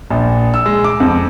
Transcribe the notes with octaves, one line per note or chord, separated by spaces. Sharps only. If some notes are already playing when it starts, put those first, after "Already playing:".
A#1
E6
G#3
D6
F2